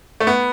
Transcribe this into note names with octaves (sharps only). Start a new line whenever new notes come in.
A3
B3